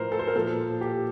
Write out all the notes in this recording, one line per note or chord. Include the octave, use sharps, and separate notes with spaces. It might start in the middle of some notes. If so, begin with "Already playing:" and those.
Already playing: A2 F3 A#4 C5
A4
C5
A#4
A#2 F3 A4
G4